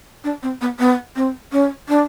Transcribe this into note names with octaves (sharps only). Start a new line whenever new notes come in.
D4
C4
B3
B3
C4
C#4
D4